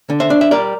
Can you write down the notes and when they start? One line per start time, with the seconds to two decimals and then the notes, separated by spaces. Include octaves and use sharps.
0.10 D3
0.20 C5 E5
0.30 D4
0.41 E5
0.51 G3 A#4 D5